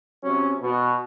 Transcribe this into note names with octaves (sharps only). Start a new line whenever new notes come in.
C3 F#3 C#4
B2